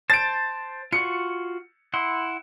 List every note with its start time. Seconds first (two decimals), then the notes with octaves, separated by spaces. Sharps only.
0.10 C5 A5 A6 D7
0.92 F4 F#4 C#7
1.94 E4 F#5 C6